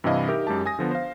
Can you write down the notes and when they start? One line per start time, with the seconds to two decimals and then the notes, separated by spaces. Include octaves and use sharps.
0.04 G2 C3 E3 E4 D#5 F5
0.28 D#4 G4 A#4 E5
0.47 F#2 G#3 G4 A5
0.66 G#5 D#6 A#6
0.79 D3 F3 B3
0.91 C5 F5